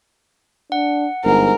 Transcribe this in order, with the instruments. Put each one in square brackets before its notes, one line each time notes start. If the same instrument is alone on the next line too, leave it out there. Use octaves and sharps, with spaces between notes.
[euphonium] D4 [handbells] F#5
[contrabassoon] G1 [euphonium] G#2 [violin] A#4